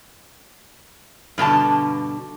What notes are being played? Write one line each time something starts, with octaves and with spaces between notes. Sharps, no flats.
G2 B2 D3 A5